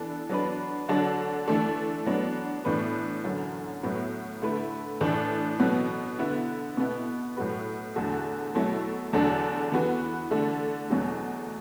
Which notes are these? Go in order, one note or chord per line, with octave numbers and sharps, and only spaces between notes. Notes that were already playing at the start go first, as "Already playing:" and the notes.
Already playing: E3 B3 D4 A4
F#3 B3 D4 B4
D3 F#3 D4 A4
E3 A3 D4 A4
F#3 B3 D4
A2 E3 B3 D4 B4
F#2 D3 F#3
A2 F#3 B3 E4
D3 A3 E4 B4
A2 E3 D4 A4
B2 F#3 B3
D3 B3 E4
B2 B3 E4
A2 F#3 A3 F#4 B4
E2 D3 A3 F#4 A4
B2 F#3 A3 E4 A4
E2 D3 F#3 D4 A4
E3 B3 F#4 B4
D3 A3 D4 A4
E2 B2 F#3 A3 F#4